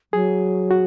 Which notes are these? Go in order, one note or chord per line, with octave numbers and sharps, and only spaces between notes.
F#3 G#4
F#4